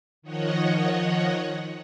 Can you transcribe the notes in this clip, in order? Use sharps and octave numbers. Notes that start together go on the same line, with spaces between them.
D#3 F3 C#5 D#5 F#5